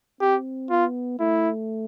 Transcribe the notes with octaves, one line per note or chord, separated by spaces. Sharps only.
C4 G4
B3 F4
A3 E4